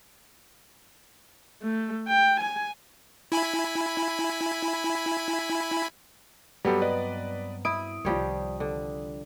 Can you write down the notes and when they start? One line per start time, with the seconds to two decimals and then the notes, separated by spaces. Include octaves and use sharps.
1.62 A3
2.08 G5
2.40 G#5
3.32 E4 G#5 B5
6.65 G2 F#3 G3 B3 C4 G4 A4
6.82 B4 D5 D#5
7.65 E4 D#6 D7
8.05 C2 D#3 F3 G3 C#5
8.60 D3